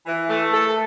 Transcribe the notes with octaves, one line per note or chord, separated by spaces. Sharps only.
E3
A3
A4